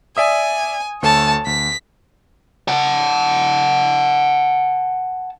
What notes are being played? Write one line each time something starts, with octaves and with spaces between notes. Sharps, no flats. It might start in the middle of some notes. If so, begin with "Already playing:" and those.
D5 E5 G#5 D#6
D2 A3 A4 C#5 A5
D2 B6
F#5 A5